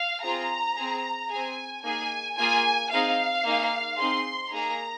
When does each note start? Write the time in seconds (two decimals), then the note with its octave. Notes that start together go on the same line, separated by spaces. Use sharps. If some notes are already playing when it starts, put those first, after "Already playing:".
Already playing: F5
0.23 C4 F4 G#4 A#5
0.76 C4 G#4
1.30 C4 G#4 G#5
1.84 A#3 D#4 G#4 G#5
2.37 A#3 F4 G#4 G#5
2.91 C4 D#4 G#4 F5
3.46 A#3 D#4 G#4
3.99 C4 D#4 G#4 C6
4.52 A#3 D#4 G#4 A#5